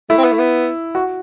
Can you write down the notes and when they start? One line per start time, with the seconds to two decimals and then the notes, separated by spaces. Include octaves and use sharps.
0.09 A3 E4
0.18 C4
0.24 B3
0.32 A3
0.39 B3
0.95 F#4